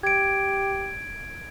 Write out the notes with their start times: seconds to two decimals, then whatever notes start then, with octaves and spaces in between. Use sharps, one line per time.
0.03 G4 G#6 D7